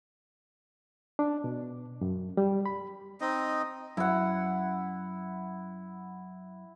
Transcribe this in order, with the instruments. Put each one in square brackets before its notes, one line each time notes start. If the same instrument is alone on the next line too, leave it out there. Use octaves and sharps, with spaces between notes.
[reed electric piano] D4
B2
F#2
G3
B5
[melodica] C4 D#4 D#5
[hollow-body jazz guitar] F#2 [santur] E4 F#5